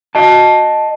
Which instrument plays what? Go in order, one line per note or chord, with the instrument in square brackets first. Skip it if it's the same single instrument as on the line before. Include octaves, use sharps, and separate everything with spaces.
[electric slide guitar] D#5 A5